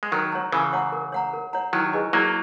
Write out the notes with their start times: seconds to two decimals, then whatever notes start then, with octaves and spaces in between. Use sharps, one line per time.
0.03 G#3
0.12 D#3 F#3 A#4
0.32 C#5 F#5 A#5
0.52 C#3 E3 A#4
0.73 C#5 F#5 A#5
0.92 A#4
1.12 C#5 F#5 A#5
1.33 A#4
1.53 C#5 F#5 A#5
1.73 D#3 F#3 E4
1.93 G#4 B4 D#5 G#5
2.13 F#3 A#3 E4